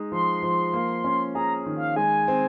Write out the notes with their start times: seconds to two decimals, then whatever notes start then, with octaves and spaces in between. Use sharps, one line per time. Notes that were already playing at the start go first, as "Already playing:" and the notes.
Already playing: G#3 D#4
0.12 F3 C6
0.43 F3
0.73 A#3
1.04 C#4
1.35 G#4 A#5
1.66 D#3
1.76 F5
1.96 G#3 G#5
2.28 C4